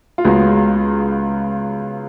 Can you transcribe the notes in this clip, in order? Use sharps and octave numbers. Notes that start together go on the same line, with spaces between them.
F4
C#2 C#3 G#3 B3 F#4